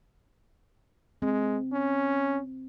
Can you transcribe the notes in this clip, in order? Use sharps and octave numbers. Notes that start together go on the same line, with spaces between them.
G#3 C4
C#4